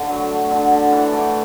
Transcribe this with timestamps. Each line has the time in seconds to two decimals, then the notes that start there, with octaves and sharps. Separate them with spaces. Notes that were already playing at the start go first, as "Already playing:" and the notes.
Already playing: D3 A3
0.10 F#3
0.31 A3
0.51 D3
0.71 D3
0.92 E3 F#5
1.12 A3 D5